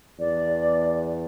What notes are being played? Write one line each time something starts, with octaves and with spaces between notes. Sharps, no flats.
E2 D5